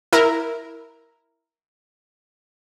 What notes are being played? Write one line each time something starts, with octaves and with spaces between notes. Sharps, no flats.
E4 A#4